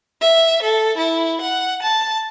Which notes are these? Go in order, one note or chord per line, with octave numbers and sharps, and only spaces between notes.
E5
A4
E4
F#5
A5